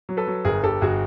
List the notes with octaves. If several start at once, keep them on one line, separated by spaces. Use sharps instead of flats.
F#3
A4 B4
F#3
G1 G#4 A#4
G1 G4 A4
G1 F#4 G#4